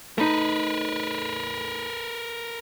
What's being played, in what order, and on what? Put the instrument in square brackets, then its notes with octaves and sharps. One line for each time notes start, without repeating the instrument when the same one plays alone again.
[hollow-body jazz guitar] A3 D#4 [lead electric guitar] A#4 B4